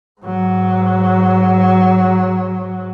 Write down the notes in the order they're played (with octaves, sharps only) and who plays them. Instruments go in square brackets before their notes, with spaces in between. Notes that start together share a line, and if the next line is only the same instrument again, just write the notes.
[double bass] G#2 F#3